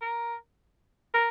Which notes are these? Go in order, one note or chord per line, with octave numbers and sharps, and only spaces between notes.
A#4
A#4